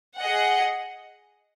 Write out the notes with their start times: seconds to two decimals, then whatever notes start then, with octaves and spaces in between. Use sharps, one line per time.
0.19 G#4 D#5 F#5